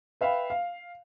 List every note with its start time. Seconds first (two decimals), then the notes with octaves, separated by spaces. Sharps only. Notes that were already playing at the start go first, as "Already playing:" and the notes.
0.21 B4 E5 F5 G5 B5
0.50 F5